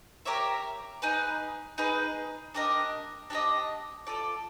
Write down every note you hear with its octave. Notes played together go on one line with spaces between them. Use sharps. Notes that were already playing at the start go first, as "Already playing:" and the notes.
G4 A#4 C#5 E5
D#4 G#4 B4
D#4 G#4 B4
D4 G4 A#4 D#5
D4 G4 A#4 D#5
F4 A4 D5